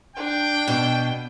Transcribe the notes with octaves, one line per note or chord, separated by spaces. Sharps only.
D4 G5
B2